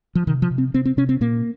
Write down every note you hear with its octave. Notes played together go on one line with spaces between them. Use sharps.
F3
C3 D#3
F3
C3
C4
C3 C4
C4
C3 C#4
C4
A#2 A#3